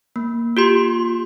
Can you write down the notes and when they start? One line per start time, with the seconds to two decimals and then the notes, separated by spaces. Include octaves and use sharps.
0.16 A#3
0.57 F4 G4 C6